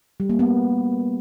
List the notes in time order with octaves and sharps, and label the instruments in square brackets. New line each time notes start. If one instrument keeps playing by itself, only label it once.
[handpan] G3
A#3
B3